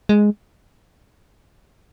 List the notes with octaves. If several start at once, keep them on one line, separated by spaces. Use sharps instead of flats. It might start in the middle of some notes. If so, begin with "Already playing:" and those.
G#3